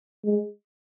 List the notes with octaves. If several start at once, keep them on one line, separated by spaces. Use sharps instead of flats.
G#3